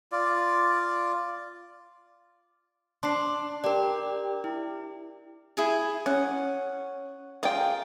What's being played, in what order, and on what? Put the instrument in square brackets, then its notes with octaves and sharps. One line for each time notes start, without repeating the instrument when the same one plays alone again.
[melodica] F4 D5
[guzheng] D4 [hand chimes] C6 C7
[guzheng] G4 [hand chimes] A#4 D5
[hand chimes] E4
[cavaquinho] E4 G#4 G#5
[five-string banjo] C#4 [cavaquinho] F#5
[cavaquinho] F4 A#4 [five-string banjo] G#4 G5